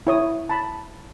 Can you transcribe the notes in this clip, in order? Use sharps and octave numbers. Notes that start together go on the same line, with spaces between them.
E4 C#5 D#6
A5 B5